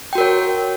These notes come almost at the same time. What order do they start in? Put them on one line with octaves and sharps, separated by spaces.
G5 F#4 A#4 C#5